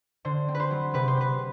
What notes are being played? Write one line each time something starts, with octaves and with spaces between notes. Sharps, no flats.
D3 C5
C4
B4
C5
F#3
C3 B4
C5
C4 B4